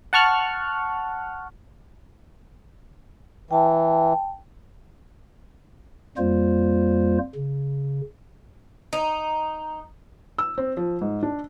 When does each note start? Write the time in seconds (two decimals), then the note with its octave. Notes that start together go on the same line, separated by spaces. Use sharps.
0.13 F#5 A5 C#6 F6 F#6
3.51 E3 G5 A5
6.18 F2 G3 A#3 F4 C5
7.35 C#3
8.93 D#4
10.38 E6
10.58 C4
10.77 F3
11.01 G#2
11.23 D4